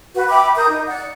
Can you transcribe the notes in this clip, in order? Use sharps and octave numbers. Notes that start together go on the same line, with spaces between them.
F#4 B4
E5 G5 B5 D6
A#4 D#6 G6
D#4
D5 F#5